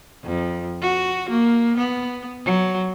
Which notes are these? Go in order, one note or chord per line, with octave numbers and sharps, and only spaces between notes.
F2
F#4
A#3
B3
F#3